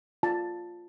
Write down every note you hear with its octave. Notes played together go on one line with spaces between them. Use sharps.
F4 A5